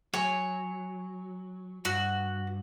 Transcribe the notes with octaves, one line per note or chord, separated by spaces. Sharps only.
F#3 C#5 G#5
G2 F#4